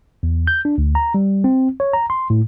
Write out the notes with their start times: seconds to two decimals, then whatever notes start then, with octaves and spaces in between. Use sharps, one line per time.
0.23 E2
0.47 G6
0.65 D4
0.78 D2
0.95 A#5
1.14 G3
1.44 C4
1.80 C#5
1.93 A#5
2.10 C6
2.30 A2